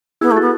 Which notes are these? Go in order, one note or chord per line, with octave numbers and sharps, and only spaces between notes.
B3 E4 G#4
A3
F#4 A4
B3